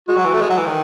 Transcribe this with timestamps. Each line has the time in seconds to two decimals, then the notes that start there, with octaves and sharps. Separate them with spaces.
0.08 G#3 F#4
0.17 F#3
0.25 E3
0.33 A3
0.41 G#3
0.50 F#3
0.58 E3
0.66 D#3